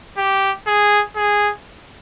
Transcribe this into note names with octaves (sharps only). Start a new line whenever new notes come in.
G4
G#4
G#4